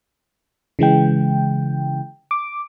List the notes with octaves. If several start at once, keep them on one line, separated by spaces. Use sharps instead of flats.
C#3 E3 G#3 G5
D6